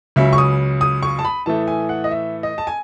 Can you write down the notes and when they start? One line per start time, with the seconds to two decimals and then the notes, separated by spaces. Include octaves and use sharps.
0.16 C#2 C#3 F#3 C#4 E5
0.33 C#6
0.38 D#6
0.81 D#6
1.03 C#6
1.19 A5
1.25 B5
1.46 A2 E3 A3 A5
1.68 G#5
1.89 F#5
2.04 D#5
2.11 E5
2.43 D#5
2.58 A5
2.67 G#5